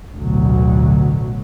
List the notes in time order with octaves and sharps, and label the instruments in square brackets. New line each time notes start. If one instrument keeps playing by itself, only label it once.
[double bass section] A1 D2 B2 F#3